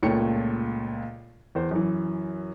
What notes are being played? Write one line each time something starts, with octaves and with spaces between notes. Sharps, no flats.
C#2 A#2 A3 C#5 G5 C#7
E2 C5
F#2 E3